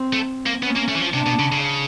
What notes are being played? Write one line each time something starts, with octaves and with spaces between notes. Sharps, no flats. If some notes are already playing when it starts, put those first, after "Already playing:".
Already playing: C4
A3
A#3
B3 C#4
A#3
A3
E3
F3
C3 D4
B2
C#3
C#3